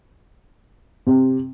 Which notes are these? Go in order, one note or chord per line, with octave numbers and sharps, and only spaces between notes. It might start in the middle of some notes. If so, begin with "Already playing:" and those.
C3